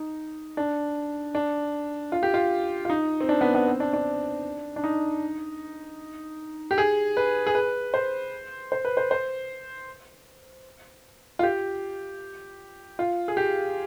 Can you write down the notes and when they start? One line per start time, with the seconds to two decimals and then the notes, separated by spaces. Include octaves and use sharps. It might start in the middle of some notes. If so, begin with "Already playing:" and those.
Already playing: D#4
0.57 D4
1.35 D4
2.12 F4
2.23 G4
2.34 F4
2.85 F4
2.90 D#4
3.20 C4
3.29 D4
3.41 B3
3.54 B3
3.67 C4
3.80 D4
3.93 D4
4.76 D4
4.84 D#4
6.71 G4
6.78 G#4
7.17 B4
7.47 G#4
7.55 B4
7.94 C5
8.72 C5
8.85 B4
8.97 C5
9.11 C5
11.39 F4
11.43 G4
12.99 F4
13.28 G#4
13.37 G4